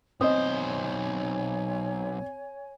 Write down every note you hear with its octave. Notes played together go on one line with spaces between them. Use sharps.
B1 C4 C5 C#5 D#5 G#5 D#6